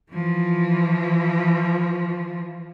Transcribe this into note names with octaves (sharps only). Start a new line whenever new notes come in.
E3 F3